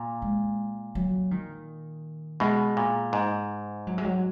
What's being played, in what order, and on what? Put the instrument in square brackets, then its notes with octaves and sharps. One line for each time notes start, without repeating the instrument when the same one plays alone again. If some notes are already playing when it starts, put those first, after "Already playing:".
Already playing: [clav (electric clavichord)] A#2
[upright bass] G#3
F#3
D#3
[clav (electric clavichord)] B2 [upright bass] G#3
[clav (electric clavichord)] A#2
G#2
[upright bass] F#3
G#3
F#3